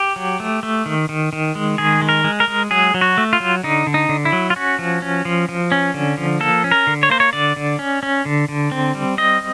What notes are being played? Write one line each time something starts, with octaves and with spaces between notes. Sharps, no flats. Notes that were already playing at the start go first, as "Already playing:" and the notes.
Already playing: G4
F#3
A3
A3
D#3
D#3
D#3
G#3
D#3 G#4
G#3
A#4
G#3
A#4
G#3
F#3 G#4
F#3
F#4
A3
F4
F#3
D3 D#4
D3
D#4
D3
E4
F#3
F4
C#4 F#4
F3
C#4
F3
F3
C#4
D3
F3
A#3 A4
C#4
A#4
D3
C#5
A#3 C5
C#5
D3 D5
D3
C#4
C#4
D3
D3
C4
G3
C4 D#5